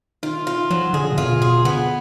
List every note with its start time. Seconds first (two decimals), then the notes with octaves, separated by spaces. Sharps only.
0.23 D#3 F4
0.47 F4
0.70 F3 F#3
0.93 D3 G#4
1.12 A#2
1.18 B2 F4
1.41 B2 G#4
1.65 D3 B3